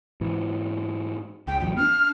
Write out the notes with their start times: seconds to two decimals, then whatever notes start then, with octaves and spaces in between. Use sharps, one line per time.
0.21 G#2 E3
1.47 C#2 G5
1.61 A1 E2 F#3 G5
1.77 B3 D4 F6